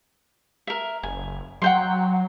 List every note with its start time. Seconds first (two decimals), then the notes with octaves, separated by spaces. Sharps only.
0.67 A#4 E5
1.03 F#1 G#5
1.62 F#3 F#5 G5 C6